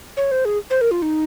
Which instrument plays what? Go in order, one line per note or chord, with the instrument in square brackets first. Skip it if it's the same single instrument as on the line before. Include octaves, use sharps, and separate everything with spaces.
[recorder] C#5
C5
G#4
C5
A#4
F4
D#4